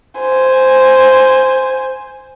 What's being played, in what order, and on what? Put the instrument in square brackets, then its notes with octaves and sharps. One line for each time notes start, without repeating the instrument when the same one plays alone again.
[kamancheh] C5 G#5